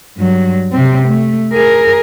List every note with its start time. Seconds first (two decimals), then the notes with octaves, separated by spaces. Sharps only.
0.18 G2 F#3
0.72 C3 C4
1.08 A3
1.52 G#4 A#4